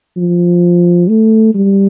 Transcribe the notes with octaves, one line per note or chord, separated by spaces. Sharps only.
F3
A3
G3